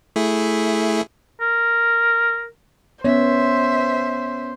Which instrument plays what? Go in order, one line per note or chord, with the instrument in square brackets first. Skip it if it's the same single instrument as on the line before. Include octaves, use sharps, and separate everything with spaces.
[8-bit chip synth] A3 E4 G#4
[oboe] A#4
[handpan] B3 [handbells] C#4 C#5 [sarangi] C5 [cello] E5